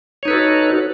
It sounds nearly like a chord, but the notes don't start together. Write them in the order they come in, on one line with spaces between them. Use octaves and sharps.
C#5 D#4 B4 A4 F#4